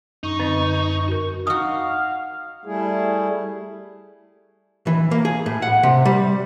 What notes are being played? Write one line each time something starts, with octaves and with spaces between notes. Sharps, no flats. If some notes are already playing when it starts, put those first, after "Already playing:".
F#2 D#4 C#6
D3 C4 D#5
F#4 A#4
D#4 F#4 F5 G#5 D#6
G3 A3 E4 G#4
E3
A#3
G#4
A2
F#5
C3
G3